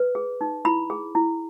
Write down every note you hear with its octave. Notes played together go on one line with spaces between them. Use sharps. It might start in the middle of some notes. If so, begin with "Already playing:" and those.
Already playing: B4
G#4
D#4
E4 B5
G#4
E4